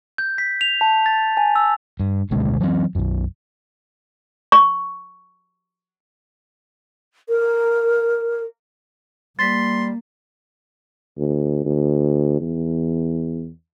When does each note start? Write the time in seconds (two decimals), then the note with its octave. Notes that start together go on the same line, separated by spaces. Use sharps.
0.18 G6
0.38 B6
0.61 F7
0.81 A5
1.06 A6
1.37 G#5
1.56 E6
2.00 G2
2.30 G#1 D2 B2 G#3
2.61 E3 F#3 A3 C4
2.95 B1 F#2
4.52 C#6
7.29 A#4
9.39 G3 A#3 C6 A6 B6
11.18 D2
11.65 D2
12.40 E2